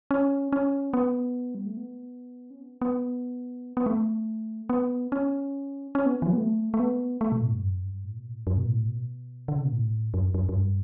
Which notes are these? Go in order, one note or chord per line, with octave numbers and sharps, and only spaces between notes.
C#4
C#4
B3
G3
A3
B3
C#4
B3
B3
B3
A3
B3
C#4
C#4
B3
E3
F#3
B3
A3
A3
B3
A3
B2
A2
G2
F#2
G2
A2
B2
A2
F#2
B2
A2
B2
D3
C#3
B2
A2
F#2
F#2
F#2
G2